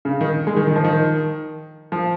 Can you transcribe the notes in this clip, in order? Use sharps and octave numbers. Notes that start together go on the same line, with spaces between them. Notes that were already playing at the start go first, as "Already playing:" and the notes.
C#3
D#3
G#3
D#3
D#3
F3
D#3
F3